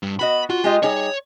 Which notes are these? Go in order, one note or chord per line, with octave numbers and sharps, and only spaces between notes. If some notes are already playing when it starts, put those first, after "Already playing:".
G2
B3 F#4 D#5 B5
F4 F#4
G#3 G4 D#5
G3 D#4 G#4 C#5